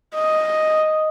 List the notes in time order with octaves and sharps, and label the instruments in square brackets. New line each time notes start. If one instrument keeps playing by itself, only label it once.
[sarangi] D#5